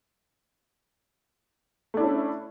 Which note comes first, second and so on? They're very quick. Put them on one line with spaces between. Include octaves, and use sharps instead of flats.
A3 D4 E4 C#4